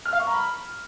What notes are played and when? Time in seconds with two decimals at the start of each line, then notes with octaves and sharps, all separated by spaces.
0.06 F6
0.13 F5
0.20 C#6
0.27 A#5
0.34 B5